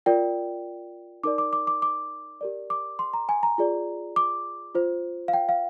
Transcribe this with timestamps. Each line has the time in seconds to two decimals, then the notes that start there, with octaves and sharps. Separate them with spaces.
0.06 F4 A#4 D5 G5
1.23 D#4 A#4 D5 D6
1.38 D6
1.53 D6
1.67 D6
1.82 D6
2.41 G4 A#4 D5
2.70 D6
2.99 C6
3.13 A#5
3.29 G#5
3.43 A#5
3.58 F4 G#4 D5
4.16 D6
4.75 F4 C5
5.28 F5
5.34 G5
5.49 F5